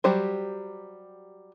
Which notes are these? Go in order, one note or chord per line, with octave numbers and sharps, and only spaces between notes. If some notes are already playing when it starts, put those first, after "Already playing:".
F#3 G3 G4 C5